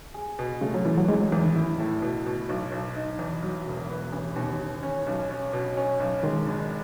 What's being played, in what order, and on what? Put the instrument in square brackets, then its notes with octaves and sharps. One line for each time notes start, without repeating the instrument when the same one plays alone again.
[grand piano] G#4
B2
[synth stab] C#3 [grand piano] A3
[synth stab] F#3
[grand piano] A1 [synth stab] E3
[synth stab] F#3
[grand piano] E2 [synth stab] G#3
[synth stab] F#3
[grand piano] E2 [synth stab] E3
[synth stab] D#3
[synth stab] G#2 [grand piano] E4
[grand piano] A2
B2
B2
B1
B1
D#4
E2
F#3
E1
B3
A1
[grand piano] D#2 [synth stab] B2
[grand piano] D#2
C#4
B1
C#4
B2
C#4
B1
[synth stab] D#3 [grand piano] G#3
[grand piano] G#1